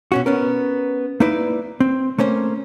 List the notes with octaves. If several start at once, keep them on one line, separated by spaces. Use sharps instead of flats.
B2 C#4 F#4
B3 C#4 A#4
A#3 D#4 E4 B4 D5
C4
A3 A#3 C#4 C5